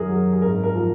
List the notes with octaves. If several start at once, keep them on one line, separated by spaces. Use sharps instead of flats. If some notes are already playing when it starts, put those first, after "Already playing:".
Already playing: F#2 D#3 G#4 A#4
F#3
G#4
G#1 A#4
A#4
F3